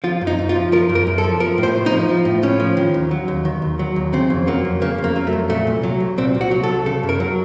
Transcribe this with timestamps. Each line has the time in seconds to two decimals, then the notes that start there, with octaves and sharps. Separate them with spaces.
0.04 F3 F4
0.21 F#2
0.27 D#4
0.39 F#2
0.49 F4
0.56 F3
0.72 F3 A#4
0.89 F#2
0.95 A#4
1.07 F#2
1.18 A4
1.24 F3
1.40 F3 A#4
1.58 A2
1.63 C5
1.75 A2
1.86 D#4
1.92 F3
2.09 F3
2.25 A2
2.43 A2 C#4
2.60 F3
2.77 D#3
2.94 D#2
3.11 F#3
3.28 D#2
3.45 D#3
3.62 D#2
3.79 F#3
3.96 D#2
4.13 C#3 C4
4.30 F2
4.47 F#3 A#3
4.65 F2
4.82 C#3 A#3
4.98 F2
5.04 A#3
5.16 F#3
5.27 A3
5.33 F2
5.50 A#2 A3
5.67 C2
5.83 F#3
6.00 C2
6.18 A#2 C4
6.34 C2
6.41 F#4
6.51 F#3
6.63 A4
6.69 C2
6.86 C#3 A4
7.03 F#2
7.09 A#4
7.20 F#3